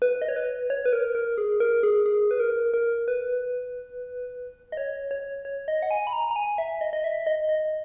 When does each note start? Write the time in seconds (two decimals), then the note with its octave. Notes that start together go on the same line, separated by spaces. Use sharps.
0.02 B4
0.22 D#5
0.28 C#5
0.36 B4
0.70 C#5
0.86 B4
0.93 A#4
1.15 A#4
1.38 G#4
1.60 A#4
1.83 G#4
2.06 G#4
2.31 B4
2.40 A#4
2.74 A#4
3.08 B4
4.72 D#5
4.77 C#5
5.11 C#5
5.45 C#5
5.68 D#5
5.82 F#5
5.91 G#5
6.07 B5
6.13 A#5
6.31 A#5
6.36 G#5
6.58 E5
6.81 D#5
6.93 D#5
7.04 E5
7.27 D#5
7.49 D#5